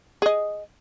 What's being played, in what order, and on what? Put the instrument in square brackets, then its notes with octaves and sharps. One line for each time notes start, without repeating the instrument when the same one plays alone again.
[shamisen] G#4 D#5